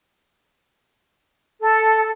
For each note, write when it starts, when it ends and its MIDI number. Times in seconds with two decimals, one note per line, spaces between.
1.62 2.10 69